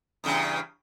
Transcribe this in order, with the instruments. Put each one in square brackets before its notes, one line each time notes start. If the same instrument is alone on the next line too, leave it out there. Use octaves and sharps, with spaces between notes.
[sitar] E2 G2 C#3